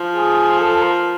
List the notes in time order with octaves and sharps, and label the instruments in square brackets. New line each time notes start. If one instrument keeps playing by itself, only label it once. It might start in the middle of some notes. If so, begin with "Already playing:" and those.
Already playing: [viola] F3
[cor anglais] G#4
A4
A#4